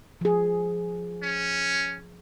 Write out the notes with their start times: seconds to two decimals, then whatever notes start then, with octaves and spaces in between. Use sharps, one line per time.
0.21 F3 G#4
1.23 C#4